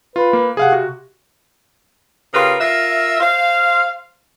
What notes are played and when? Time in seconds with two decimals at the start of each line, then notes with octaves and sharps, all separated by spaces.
0.16 F4 B4
0.33 A#3
0.57 C3 G#4 F5 F#5
0.72 F#4
2.33 C#3 F4 G4 A#4 B4
2.60 F4 A#4 E5
3.20 C5 F5